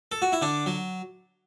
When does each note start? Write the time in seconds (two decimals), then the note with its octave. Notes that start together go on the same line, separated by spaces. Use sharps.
0.12 A4
0.22 F#4
0.32 E4
0.42 D3 D4
0.66 F#3